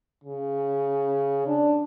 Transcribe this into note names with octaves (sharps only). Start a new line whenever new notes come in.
C#3
D4